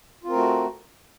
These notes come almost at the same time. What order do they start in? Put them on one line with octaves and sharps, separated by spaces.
F4 C4 A#4 A3 F#4